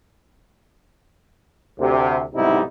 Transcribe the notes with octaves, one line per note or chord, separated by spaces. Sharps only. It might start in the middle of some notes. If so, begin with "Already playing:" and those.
D2 C3
B1 G#2 C3 G3 D#4 E4